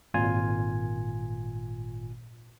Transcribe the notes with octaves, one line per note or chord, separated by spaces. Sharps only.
G#1 A#2 F4 G#5 G#6